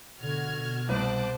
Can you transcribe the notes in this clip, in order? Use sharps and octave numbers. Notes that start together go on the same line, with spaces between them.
B2 D3 F#4 F6 G#6
B2
C2 C5 A5 D6 F#6